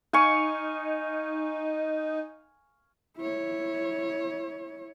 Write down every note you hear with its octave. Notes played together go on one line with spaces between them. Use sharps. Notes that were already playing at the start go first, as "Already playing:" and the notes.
D#4 F5 G#5 C#6
E4 C#5